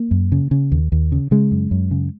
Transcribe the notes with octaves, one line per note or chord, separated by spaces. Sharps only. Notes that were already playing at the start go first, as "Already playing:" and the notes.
Already playing: A#3
F#2
C#3
C#3
D#2
D#2
C#3
C#3 G#3
F#2
F#2
C#3